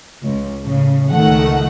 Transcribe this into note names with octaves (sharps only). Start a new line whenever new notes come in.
C#2
A2 C#3
C#2 D#3 A3 F#5